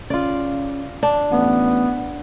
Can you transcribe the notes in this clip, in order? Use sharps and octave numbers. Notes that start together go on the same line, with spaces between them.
C#3 F4 D5
D4
A1 B3